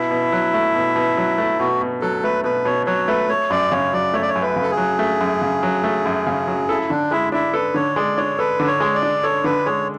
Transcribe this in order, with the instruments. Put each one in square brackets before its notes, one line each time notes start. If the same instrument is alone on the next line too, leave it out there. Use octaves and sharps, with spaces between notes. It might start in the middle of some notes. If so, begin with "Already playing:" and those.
Already playing: [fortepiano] B2 [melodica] E4
[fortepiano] B2
F#3
A3
B2
B2
F#3
A3
[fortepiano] B2 [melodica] F#4
[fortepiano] B2
[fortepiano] F#3 [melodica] A4
[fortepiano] A3 [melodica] B4
[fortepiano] B2 [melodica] B4
[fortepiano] B2 [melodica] C#5
[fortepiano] F#3 [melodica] C#5
[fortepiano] A3 [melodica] B4
[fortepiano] A3 [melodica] C#5
[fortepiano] F#2 [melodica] D5
[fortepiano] C#3 [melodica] C#5
[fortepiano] F#3 [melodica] D5
[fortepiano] A3 [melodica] C#5
[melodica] D5
C#5
[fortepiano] F#2
[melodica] B4
[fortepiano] C#3
[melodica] A4
G#4
[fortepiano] F#3
A3
F#2
C#3
F#3
A3
F#2
C#3
F#3
[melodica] E4 [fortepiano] A4
[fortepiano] D3 [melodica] D4
[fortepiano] G#3 [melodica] E4
[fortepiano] D4 [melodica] E4
[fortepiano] A4 [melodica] B4
[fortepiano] D3 [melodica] C#5
[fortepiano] G#3 [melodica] D5
[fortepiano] D4 [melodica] C#5
[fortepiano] A4 [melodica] B4
[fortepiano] D3
[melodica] C#5
[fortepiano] G#3
[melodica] D5
[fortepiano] D4
[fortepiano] A4 [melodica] C#5
[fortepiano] D3 [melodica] B4
[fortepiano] G#3 [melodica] C#5